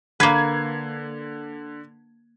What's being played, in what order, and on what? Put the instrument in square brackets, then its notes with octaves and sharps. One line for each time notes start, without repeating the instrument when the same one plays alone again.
[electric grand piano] D3 G#6 C7 [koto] A#3 B4